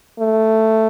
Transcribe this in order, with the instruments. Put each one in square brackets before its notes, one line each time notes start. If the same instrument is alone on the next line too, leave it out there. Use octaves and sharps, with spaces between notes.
[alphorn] A3